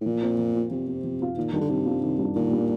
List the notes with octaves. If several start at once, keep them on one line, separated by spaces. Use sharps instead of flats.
A2
A#2 F3
C4 F4
F3
C4 F4
C3 F3
C4 F4
F3
C4 F4
A#2 D#3
D#3 G3 D4 F4
D3
C3 D#3
G3 D4 F4
D#3
G3 D4 F4
A#2 D#3
G3 D4 F4